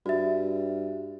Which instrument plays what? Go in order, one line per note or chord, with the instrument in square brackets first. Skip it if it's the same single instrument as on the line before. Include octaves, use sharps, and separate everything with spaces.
[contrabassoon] G2 [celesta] F#4 E5